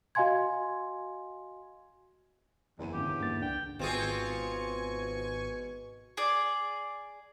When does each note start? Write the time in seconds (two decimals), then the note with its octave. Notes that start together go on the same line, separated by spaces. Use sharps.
0.15 F#4 D#5 F5 G#5 C6 G#6
2.79 F#1 E2 D#7
2.94 G#1 D2 C#3 G4
3.21 G2 A#3 A6
3.42 C2 D4 G5
3.79 G#1 B2 C4 F4 G#4 G#5 C#6
6.17 G#4 D5